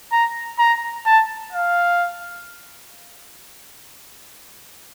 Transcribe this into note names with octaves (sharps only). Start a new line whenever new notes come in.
A#5
A#5
A5
F5